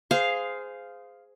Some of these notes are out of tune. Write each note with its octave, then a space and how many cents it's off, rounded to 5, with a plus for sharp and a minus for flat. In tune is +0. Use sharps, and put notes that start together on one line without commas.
G#4 +0 C5 -20 F5 +0